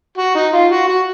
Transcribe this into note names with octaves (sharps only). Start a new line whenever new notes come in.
F#4
D#4
F4
F#4
F#4